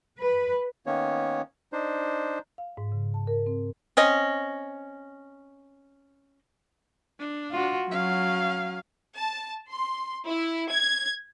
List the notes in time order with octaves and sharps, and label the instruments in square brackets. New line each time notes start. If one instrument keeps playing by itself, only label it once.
[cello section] B4
[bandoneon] D#3 A#3 B3 C#4 C#5
D4 D#4 C5
[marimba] F5
G#2
C#3
A5
A#4
C4
[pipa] C4 C#4 D#5
[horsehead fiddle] D4
[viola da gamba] F4 F#4
[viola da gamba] F#3 [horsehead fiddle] C#4 F5
[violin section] A5
C6
E4
G#6